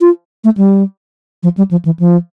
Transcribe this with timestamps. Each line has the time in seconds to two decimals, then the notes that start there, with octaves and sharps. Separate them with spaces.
0.01 F4
0.44 A3
0.57 G3
1.43 F3
1.57 G3
1.71 F3
1.85 E3
2.00 F3